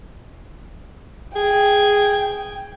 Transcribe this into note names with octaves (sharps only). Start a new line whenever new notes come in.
G#4 G5